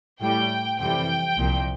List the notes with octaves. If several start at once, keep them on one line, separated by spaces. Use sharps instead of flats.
A2 G3 G5
F2 C3 E3 G3 G5
C2 A#2 F3